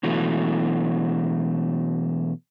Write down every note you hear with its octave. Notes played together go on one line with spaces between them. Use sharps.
B2 E3 F#3 A3